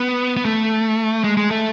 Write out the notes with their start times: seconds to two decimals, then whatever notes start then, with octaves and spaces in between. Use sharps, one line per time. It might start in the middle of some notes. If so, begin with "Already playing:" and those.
Already playing: B3
0.37 B3
0.45 A3
1.24 G#3
1.37 G#3
1.50 A3